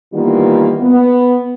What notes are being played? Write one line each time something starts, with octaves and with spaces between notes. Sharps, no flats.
D#3 E3 G3 A#3 B3 F4
B3